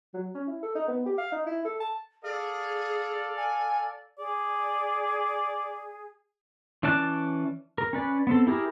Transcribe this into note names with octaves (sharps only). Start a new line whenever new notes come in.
F#3
C#4
E4
A4
D#4
B3
G4
F5
D#4
E4
A4
A5
G#4 A4 D5 F5
G#5
G#4 D5
E3 C#4 D5 A5 F#6
A#4
C#4 B4 D5
B3 C4 A4
E4 G4 G#4 A#4